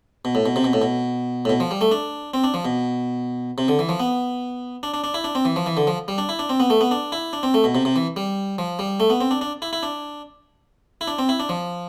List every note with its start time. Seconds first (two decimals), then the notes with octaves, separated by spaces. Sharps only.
0.25 B2
0.35 A2
0.46 B2
0.56 C3
0.64 B2
0.73 A2
0.82 B2
1.45 A2
1.49 B2
1.60 F3
1.71 G3
1.81 A3
1.92 D4
2.34 C4
2.44 D4
2.54 F3
2.65 B2
3.58 C3
3.68 D3
3.79 E3
3.89 F3
4.00 B3
4.83 D4
4.94 D4
5.04 D4
5.14 E4
5.24 D4
5.35 C4
5.45 E3
5.56 F3
5.66 E3
5.77 D3
5.87 F3
6.08 G3
6.18 D4
6.29 E4
6.39 D4
6.50 C4
6.60 B3
6.70 A3
6.81 B3
6.91 D4
7.12 E4
7.33 D4
7.43 C4
7.54 A3
7.64 B2
7.75 C3
7.85 C3
7.96 E3
8.16 G3
8.58 F3
8.79 G3
9.00 A3
9.10 B3
9.21 C4
9.31 D4
9.41 D4
9.62 E4
9.73 E4
9.83 D4
11.01 E4
11.07 D4
11.19 C4
11.29 E4
11.40 D4
11.49 F3